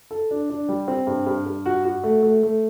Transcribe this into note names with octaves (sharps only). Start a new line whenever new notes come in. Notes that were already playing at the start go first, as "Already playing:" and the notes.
A4
D4
D4
G3
C4
G2
G2
G2
F#4
F#4
A3
A3
A3